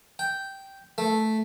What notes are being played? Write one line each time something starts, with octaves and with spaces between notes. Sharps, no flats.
G5
A3